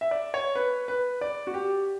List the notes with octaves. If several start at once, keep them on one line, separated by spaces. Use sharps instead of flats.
E5
D5
C#5
B4
B4
D5
F#4
G4